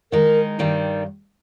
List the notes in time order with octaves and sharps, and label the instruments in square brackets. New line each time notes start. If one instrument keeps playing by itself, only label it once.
[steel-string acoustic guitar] D#3 G#3 D#4 [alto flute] A#4
[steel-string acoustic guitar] G2 D#3 G3